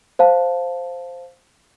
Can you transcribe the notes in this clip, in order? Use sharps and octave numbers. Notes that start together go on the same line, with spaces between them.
C5 F5 A5